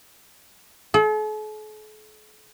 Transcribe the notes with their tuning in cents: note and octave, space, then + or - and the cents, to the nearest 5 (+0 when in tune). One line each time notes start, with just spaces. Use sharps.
A4 -45